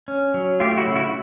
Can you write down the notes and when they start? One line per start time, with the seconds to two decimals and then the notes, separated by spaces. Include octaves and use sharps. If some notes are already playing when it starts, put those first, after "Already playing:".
0.08 C#4
0.34 F#3
0.60 A3 F4 G4
0.77 E4 F#4
0.87 C#3
0.95 E4 F#4